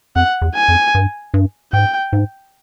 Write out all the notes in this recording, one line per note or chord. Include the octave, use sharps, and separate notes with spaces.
F2 F#5
E2
G#5
F2
G2
G2
G#2 G5
G#2